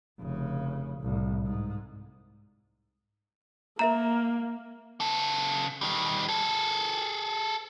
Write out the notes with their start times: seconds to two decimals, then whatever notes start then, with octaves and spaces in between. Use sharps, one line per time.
0.20 F1 C#3
1.01 C2 A2
1.45 G#2
3.79 A#3 A#4 E5 A#5
5.00 C#3 A4
5.81 D#3 G3
6.28 G#4 A4